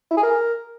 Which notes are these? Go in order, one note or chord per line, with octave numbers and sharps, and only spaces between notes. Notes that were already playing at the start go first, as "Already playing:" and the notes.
E4
G#4
A#4